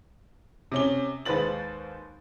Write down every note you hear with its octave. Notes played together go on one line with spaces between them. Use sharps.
C3 C#4 G7
D#2 G#3 B4 C5 A6 F#7